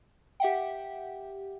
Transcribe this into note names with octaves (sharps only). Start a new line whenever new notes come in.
G4 E5 F#5 G5